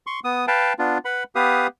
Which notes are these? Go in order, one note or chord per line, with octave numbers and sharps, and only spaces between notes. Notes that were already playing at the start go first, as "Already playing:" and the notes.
C6 C#6
B3 D#6
B4 F5 G5 A5
B3 D4 F4
B4 F#5 B5
B3 G4 B4 F5 D#6